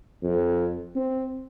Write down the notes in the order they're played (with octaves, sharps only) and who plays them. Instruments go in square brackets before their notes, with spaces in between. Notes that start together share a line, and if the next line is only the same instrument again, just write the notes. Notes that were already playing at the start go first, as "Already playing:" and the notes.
[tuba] F2
C4